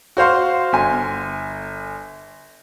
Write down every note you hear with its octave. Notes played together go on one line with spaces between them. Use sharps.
F#4 C5 F5 C6
G1 G#5